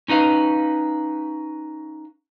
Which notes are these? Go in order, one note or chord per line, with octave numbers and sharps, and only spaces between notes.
C#4 D#4 B4 F5